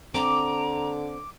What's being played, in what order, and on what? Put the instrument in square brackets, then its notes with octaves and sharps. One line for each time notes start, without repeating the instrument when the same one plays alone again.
[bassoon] D3 [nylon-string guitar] C4 [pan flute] A#5 [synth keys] D6